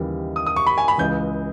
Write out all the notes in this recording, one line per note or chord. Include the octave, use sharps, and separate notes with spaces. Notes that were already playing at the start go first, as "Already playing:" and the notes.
Already playing: D#2 C#3 E3 G3
D#6
D#6
C#6
B5
G#5
B5
C#2 C#3 E3 G6